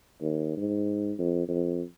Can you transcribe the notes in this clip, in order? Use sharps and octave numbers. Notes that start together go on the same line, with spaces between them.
D#2
G#2
F2
F2